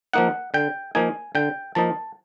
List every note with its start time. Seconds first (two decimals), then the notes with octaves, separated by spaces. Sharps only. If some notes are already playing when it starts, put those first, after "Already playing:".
0.13 F3 A#3 D#4 F#5
0.54 D3 G5
0.95 F3 A#3 D#4 G#5
1.35 D3 G5
1.75 F3 A#3 D#4 A5